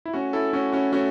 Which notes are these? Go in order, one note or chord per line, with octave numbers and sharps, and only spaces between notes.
E4
A3 C#4 F#4
E4 A4
A3 C#4 F#4
C#4 F#4
A3 C#4 F#4